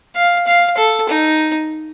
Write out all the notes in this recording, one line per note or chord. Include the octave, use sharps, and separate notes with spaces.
F5
F5
A4
D#4